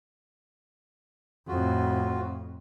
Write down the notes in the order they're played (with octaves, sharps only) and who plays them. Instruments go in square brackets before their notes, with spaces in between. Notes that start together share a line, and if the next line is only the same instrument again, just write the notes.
[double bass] F2 A2 [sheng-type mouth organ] F4 F#4